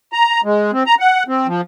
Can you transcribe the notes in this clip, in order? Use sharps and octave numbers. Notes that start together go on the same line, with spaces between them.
A#5
G#3
C4
A#5
F#5
C4
F3